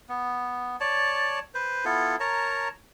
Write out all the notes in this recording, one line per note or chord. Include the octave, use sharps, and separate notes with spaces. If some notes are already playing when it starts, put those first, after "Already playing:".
B3
C#5 D5 A5
B4 C5
B3 E4 F4 A4
A#4 C#5 A5 A#5